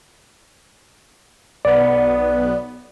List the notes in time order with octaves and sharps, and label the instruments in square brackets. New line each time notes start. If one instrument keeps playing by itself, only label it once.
[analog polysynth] B1 B3 [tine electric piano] D5